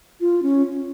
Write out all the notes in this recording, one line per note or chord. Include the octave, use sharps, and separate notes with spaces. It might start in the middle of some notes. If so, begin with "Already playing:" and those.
F4
C#4